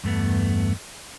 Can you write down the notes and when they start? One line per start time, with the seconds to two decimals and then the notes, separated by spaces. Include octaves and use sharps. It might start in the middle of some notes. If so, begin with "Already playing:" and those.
0.04 E2 G2 A3 B3